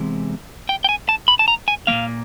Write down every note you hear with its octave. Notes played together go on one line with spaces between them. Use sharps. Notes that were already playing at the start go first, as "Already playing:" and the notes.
Already playing: E2 C3 E3 G#3 C4
G5
G5
G#5
A5
B5
A5
A#5
G#5
A#2 F3 A#3 F5